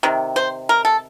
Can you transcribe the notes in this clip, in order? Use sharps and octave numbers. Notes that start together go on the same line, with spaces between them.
C3 D#3
C5
A#4
A4